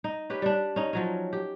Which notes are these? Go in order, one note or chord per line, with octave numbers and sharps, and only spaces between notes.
D#4
C#4 G4 B4
G3 D4
C#4 D#4
F3 F#3 C#4
G4